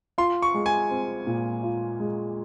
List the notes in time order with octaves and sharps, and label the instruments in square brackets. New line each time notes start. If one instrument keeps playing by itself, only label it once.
[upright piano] F4 [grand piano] C6
[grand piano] C#6
[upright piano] G#3
[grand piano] G#5
[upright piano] C4
A#2
F4
G#3